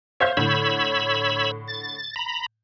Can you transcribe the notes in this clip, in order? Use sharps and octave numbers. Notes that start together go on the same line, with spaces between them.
C5 C#5 E5 F5 G6
A2 D3 C#5 B5 E6
A6
A#5 B5